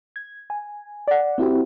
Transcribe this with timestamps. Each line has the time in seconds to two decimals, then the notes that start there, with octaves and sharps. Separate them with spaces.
0.16 G#6
0.50 G#5
1.08 D5 F#5
1.38 C4 E4 F#4 G4